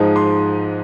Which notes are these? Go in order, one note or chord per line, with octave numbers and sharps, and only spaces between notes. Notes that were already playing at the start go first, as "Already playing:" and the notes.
Already playing: G#2 F3 G#3 D#4
C6